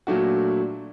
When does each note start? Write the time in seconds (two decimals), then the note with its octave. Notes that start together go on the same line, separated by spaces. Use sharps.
0.07 A#2 F#3 A3 D4 F#4